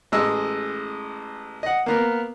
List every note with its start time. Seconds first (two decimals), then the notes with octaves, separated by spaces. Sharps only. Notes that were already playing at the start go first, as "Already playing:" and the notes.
0.12 A1 G#3 D#5 E6
1.63 D#5 F#5
1.86 A#3 B3 A#4